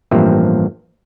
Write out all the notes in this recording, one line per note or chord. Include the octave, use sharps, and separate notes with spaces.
A1 G2 F3 A#3 C4 E5